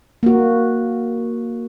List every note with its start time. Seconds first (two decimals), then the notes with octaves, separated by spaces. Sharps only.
0.23 A#3 F#4